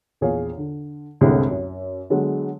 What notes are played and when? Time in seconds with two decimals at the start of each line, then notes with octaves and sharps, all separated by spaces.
0.21 A#1 E2 G#4 C#5 F5
0.58 D3
1.21 C2 F#2 A2 D3 G#3 C4
1.51 F#2
2.10 D3 F#3 G#3 B3